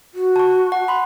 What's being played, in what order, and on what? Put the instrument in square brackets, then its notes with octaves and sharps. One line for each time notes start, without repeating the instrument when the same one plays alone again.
[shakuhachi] F#4
[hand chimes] A5 C#6
F#5
B5 C6